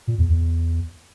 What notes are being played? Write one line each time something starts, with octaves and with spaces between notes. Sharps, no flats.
A#2
E2
E2